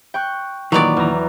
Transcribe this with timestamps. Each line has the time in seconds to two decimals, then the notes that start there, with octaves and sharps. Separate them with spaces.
0.14 G5 C#6 F#6
0.72 A#2 D#3 E3 F#3 B3 D5
0.97 E2 A#5